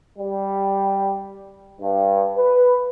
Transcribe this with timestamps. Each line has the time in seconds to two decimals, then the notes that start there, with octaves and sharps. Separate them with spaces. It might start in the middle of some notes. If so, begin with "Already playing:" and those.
0.18 G3
1.81 G2
2.36 B4